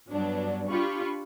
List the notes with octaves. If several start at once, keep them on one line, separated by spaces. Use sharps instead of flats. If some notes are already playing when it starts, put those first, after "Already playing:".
G2 F#3 B3 D4
D4 F4 G4 B5 C#6